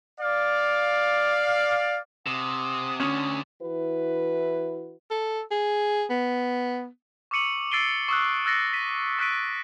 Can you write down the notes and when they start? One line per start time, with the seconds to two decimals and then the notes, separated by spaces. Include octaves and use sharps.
0.21 D5 F5
2.26 C3 F#5 G#5 D#6
3.00 D2 D3 C#4
3.61 E3 E4 F#4 B4
5.11 A4
5.51 G#4
6.10 B3
7.31 C#6 D6 E6 C#7 D#7 F#7
7.71 E6 A6 C7 D7 D#7 G7
8.08 C#6 D#6 E6 F#6
8.46 E6 F#6 A6 A#6 C7 C#7
8.73 B6 D#7
9.19 C#6 E6 F#6 B6 D7 D#7